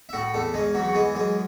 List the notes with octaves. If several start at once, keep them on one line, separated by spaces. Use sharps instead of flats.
E5
A2 F#4 F#5
E2 A3 A4
C#3 G#3 G#4
E2 F#3 F#4
F#4
E3 G#3 G#4
F#2 G#3 G#4